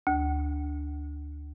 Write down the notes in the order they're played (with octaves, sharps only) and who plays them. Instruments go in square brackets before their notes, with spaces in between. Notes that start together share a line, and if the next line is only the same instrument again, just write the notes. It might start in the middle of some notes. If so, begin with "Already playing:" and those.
[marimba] D2